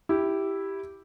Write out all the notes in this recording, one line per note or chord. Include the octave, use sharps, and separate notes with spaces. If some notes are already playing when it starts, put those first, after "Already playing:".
E4 G4